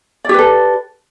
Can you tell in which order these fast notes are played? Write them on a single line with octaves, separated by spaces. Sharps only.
D5 G4 B4 A4